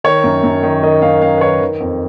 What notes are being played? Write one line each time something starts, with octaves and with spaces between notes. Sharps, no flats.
D#3 C#5
F#2
F#2
D#3
D#3 D#5
F#2 F5
F#2 F5
B4
D#3 C#5
D#3
F2